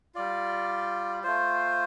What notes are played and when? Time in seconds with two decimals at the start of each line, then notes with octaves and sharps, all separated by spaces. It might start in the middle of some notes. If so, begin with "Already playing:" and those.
0.15 G3 F4 D5
1.23 A3 F4 C5